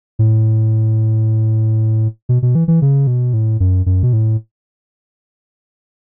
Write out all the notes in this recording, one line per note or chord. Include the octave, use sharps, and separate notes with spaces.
A2
B2
B2
E3
E3
C#3
B2
A2
F#2
F#2
B2
A2